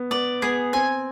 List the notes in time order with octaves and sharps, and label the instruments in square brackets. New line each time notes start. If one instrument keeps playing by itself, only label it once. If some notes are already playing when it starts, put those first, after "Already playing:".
Already playing: [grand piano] B3
[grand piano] B3 [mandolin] D5
[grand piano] B3 [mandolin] G#4
[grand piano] C4 [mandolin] G#5